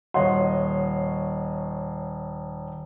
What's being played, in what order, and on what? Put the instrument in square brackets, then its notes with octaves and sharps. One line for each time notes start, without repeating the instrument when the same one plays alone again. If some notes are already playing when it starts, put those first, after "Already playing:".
[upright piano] D#1 C#5 D#5 F#5 C6